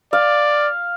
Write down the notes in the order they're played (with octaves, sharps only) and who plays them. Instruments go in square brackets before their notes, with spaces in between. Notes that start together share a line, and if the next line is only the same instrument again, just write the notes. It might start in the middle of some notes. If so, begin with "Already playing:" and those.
[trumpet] D5 [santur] F5